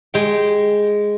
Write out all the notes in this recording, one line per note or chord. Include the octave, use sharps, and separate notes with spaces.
G#3 G5